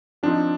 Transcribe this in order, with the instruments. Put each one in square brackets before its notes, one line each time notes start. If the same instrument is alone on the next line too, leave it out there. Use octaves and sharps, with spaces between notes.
[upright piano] F3 C4 D#4 [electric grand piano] D4